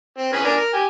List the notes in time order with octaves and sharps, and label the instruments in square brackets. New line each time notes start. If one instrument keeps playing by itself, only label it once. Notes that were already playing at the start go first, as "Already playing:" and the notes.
[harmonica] C4
C#4 G#4 B4
D4 A#4 G#5
A#4
G4 G#5